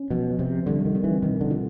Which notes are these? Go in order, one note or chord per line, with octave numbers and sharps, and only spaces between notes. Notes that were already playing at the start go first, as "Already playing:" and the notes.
Already playing: C#4
B2 F3
C3 F3
D3 G3
D#3
C4
E3
B2 D#3
D3
F4